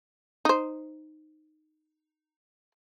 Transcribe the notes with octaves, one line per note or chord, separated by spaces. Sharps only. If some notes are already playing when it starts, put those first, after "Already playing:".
D#4 C5